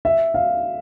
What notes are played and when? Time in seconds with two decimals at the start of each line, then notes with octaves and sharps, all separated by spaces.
0.05 E5
0.34 F5